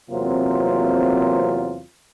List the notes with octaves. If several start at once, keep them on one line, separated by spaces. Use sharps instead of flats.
E2 C3 F#3 A#3 C4 F4